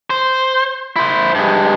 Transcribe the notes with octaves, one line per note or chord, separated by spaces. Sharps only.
C5
E4 C5
G2 G#3